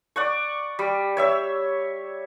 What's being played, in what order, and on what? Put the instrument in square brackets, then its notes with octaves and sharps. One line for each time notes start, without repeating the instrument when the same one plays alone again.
[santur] D5 F#5 C#6
G3
C#5 E5 E6